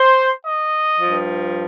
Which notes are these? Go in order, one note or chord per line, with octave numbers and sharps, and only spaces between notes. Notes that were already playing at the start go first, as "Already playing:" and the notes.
Already playing: C5
D#5
G2 F3